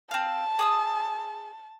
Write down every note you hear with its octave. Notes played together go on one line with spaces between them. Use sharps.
C4 F5 A5
G#4 D#6 E6